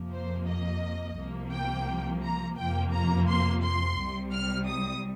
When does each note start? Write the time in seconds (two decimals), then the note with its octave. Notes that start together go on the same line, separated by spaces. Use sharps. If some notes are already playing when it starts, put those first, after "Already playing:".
Already playing: F2 C3 F3 A#3
0.12 C5
0.46 D#5
1.17 C2 C3 F3 A#3
1.52 G5
2.23 A#5
2.58 F2 C3 F3 A#3 G5
2.93 A#5
3.28 C6
3.63 C6
3.98 C2 C3 G3
4.34 F6
4.68 D#6